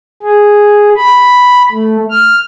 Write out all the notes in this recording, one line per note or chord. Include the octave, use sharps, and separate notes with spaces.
G#4
B5
A3
F6